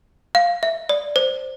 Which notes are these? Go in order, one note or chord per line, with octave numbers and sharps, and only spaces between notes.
F5
E5
D5
C5